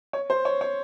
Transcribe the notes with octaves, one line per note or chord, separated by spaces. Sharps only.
C#5
C5
C#5
C#5